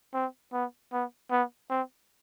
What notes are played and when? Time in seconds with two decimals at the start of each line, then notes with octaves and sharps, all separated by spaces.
0.14 C4
0.53 B3
0.93 B3
1.31 B3
1.70 C4